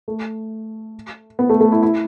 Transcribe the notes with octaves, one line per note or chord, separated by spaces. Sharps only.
A3
B3
A3
A3
E4
E4